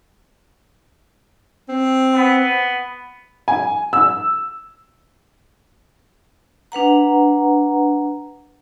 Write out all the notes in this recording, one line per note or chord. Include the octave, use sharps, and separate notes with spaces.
C4
B3
G#5
E6
D4 B4 F#5 A#5